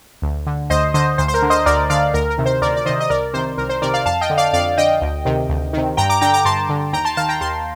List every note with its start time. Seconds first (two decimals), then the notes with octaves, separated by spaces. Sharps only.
0.22 D2
0.47 D3
0.70 D2 C5 D#5
0.94 D3 C5 D#5
1.18 D2 C5
1.28 C5
1.34 A#4
1.42 D3
1.50 C5 D#5
1.66 D2 A#4 D5
1.90 D3 D5 F5
2.14 D2 A#4
2.30 A#4
2.38 C3 D#3
2.46 C5
2.62 D2 A#4 D5
2.76 D5
2.86 C3 D#3 C5 D#5
3.00 D#5
3.10 C2 A#4 D5
3.34 C3 D#3 C5
3.58 C2 A#4
3.69 C5
3.82 C3 D#3 A#4 D5
3.94 D5 F5
4.06 F2 F5 A5
4.21 D#5 G5
4.30 D3
4.38 D5 F5
4.53 F2 D5 F5
4.78 D3 D#5 G5
5.01 D2
5.25 C3 D#3
5.49 D2
5.73 C3 D#3
5.97 G2 G5 A#5
6.09 A#5 D6
6.21 D3 G5 A#5
6.33 A#5 D6
6.45 G2 A5 C6
6.69 D3
6.93 D#2 G5 A#5
7.05 A5 C6
7.17 D#3 F5 A5
7.29 G5 A#5
7.41 D#2 A5 C6